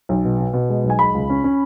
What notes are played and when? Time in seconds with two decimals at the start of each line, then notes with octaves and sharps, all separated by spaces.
0.09 B1
0.24 B2
0.40 B2
0.53 B2
0.69 G#3
0.84 B1
0.90 G#5
0.99 G#3 B5
1.14 C#2
1.30 C#4
1.44 C#4